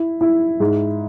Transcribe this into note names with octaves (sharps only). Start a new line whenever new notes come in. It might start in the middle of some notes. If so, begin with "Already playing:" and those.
Already playing: E4
E4
G#2